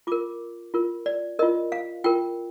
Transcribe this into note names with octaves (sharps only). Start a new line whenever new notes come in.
F4 A#4 D6
F4 A#4
D5
F4 A#4 D#5
F5
F4 A#4 G5